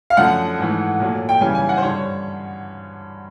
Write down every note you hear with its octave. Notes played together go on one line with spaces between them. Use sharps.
F5
F#2 D3 F3 A3 F#5
G#2 E3 A3
A#2 F#3 A3
G5
F#2 C#3 E3 G3 G#5
G#5
F#5
C5
G2 D3 G3 C#5